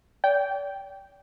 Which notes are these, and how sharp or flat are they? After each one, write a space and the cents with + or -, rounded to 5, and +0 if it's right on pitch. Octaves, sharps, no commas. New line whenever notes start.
D5 -40 G5 -5